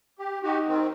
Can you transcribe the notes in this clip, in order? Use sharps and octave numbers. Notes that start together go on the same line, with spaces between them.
G4
D#4 F#4 G4
D#3 C4